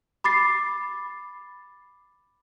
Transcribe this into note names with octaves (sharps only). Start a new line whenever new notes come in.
B5 D6 A6 C7